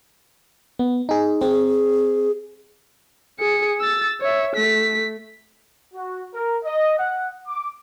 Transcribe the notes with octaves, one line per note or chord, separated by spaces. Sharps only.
B3
D#4 G#4
C4 G#4
G#4 C#7
E6 A6
C#5 E5
A3 B6
F#4
A#4
D#5
F#5
D6